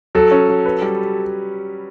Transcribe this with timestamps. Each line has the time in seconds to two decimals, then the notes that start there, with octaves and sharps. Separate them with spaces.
0.15 F#3 A4
0.31 C#4
0.49 F#3
0.65 B4
0.82 G3